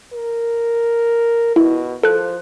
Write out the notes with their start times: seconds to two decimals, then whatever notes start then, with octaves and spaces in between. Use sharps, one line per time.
0.13 A#4
1.56 B2 E4
2.03 F3 A4 F#6